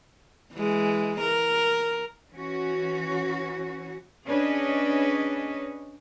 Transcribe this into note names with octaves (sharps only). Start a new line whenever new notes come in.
E3 G#3
A#4
E3 C#4 F#4
C#4 D4 G#4 B4 C#5 D#5